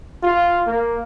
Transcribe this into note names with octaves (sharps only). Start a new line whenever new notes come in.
F4
A#3